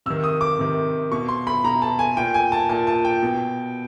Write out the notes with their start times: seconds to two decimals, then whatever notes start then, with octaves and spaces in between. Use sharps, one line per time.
0.06 C3 D#3 E6
0.24 D#6
0.41 D6
0.59 C3 D#3
1.11 B2 C#6
1.28 C6
1.47 B5
1.64 B2 A#5
1.82 A5
1.99 G#5
2.17 A#2 G5
2.34 G#5
2.52 A5
2.69 A#2 A5
2.87 A5
3.05 G5
3.23 B2